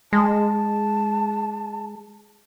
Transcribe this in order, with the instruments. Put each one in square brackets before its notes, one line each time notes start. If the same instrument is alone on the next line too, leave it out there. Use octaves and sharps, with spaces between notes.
[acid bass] G#3 [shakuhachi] A5